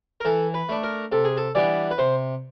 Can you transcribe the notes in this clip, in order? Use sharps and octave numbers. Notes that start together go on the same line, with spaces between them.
A#4
E3 A4
B4
A3 D4
A#4
C3 A4
G#4
A4
E3 G3 B3 D4 D5
B4
C3 C5